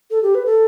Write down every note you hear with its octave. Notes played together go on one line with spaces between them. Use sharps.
A4
G4
B4
A4